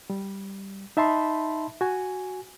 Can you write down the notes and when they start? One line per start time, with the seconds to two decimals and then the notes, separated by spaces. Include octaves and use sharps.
0.10 G3
0.97 D#4 E5 A5 B5 C6
1.81 F#4 G#5